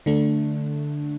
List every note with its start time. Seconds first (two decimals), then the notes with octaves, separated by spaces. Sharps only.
0.06 D3 A3 D4